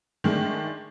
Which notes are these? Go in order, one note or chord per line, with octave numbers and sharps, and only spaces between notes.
D#3 G#3 A3 D4